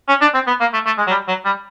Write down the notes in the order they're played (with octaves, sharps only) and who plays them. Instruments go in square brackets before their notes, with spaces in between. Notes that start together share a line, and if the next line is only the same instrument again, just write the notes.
[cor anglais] C#4
D4
C4
B3
A#3
A3
A3
G#3
F#3
G3
F#3
G3